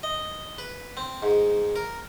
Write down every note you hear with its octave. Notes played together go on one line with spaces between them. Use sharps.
D#5
B4
C4
G#2
A#4